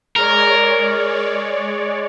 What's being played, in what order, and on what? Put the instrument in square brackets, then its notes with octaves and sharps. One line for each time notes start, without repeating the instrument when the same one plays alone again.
[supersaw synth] G#3 C#5 D5 [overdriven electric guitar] A#4